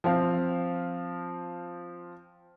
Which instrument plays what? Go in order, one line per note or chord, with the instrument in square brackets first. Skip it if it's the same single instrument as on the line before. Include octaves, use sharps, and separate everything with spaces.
[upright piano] F3 C4 F5